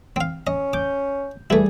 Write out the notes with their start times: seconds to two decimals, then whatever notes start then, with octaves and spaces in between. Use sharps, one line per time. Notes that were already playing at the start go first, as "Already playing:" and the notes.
0.16 C4 F5
0.47 C#4 D#5
0.73 D6 G6
1.50 E3 G3 A3 E4 G#4